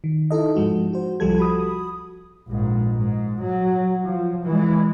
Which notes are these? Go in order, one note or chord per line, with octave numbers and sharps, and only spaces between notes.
D#3
D#4 E4 A4 D#5
G#2 F3 G#3 F#4
F#4 C5
C2 F3 G3 G4 A4 G#6
F#4 B5 D#6
A#1 G#2
G#2
F#3
F3
E3 G#3